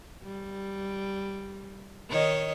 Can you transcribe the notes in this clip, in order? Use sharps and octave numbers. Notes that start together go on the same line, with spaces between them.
G3
D#3 C#5 D#5